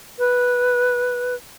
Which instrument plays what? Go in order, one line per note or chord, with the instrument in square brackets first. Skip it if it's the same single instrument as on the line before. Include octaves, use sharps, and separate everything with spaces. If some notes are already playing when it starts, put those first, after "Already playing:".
[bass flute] B4